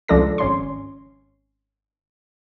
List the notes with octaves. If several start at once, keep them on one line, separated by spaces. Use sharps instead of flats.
C#2 F3 D4 A4 A#6
G#1 C#4 C6